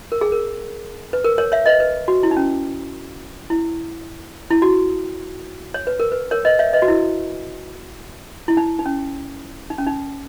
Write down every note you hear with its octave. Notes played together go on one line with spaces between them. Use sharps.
A#4
G#4
A#4
B4
A#4
A#4 C#5
C#5 E5
B4 D#5
B4
F#4
E4
D#4
C#4
E4
E4
F#4
C#5
B4
A#4
B4
A#4 C#5
B4 D#5
C#5 E5
B4 D#5
F#4
E4
E4
D#4
D#4
C#4
D#4
C#4
D#4